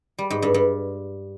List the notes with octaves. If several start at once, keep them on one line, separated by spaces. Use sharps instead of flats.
G3
G#2
G2
G2